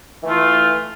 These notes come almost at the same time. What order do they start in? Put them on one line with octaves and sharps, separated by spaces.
E3 A3 F4